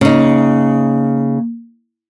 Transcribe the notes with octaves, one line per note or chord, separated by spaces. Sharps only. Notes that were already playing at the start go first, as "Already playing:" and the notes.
C#3 A#3 D#4